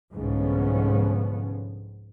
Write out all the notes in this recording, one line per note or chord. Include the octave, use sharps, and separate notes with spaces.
C2 G#2 D3 F3 B3 C#4